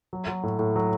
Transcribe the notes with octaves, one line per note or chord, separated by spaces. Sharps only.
F#3
F#3
A2
A2
F#3